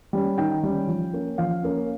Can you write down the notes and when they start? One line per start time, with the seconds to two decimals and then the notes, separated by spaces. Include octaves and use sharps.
0.13 G3 C#4
0.38 D#3 G5
0.63 G3 C#4
0.88 F3
1.13 A#3 C#4
1.38 F3 F5
1.63 A#3 C#4